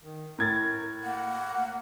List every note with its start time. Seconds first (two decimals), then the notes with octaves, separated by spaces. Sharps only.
0.01 D#3
0.38 A2 A#4 G#6 A6
1.04 A#3 F#5